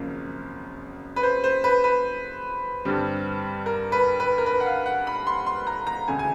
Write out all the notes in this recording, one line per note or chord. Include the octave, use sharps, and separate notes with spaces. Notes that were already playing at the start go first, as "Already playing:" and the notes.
Already playing: G#1 F#2 C#3 F3 A#3
B4
C5
C5
B4
B4
G2 D3 G3 C4
A#4
B4
B4
A#4
B4
F#5
F5
F#5
B5
C6
C6
A#5
A#5
E1 D2 C#3 G#5
G#5